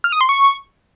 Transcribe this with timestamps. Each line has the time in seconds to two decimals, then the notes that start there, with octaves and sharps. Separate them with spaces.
0.04 F6
0.12 D#6
0.21 C6
0.29 C#6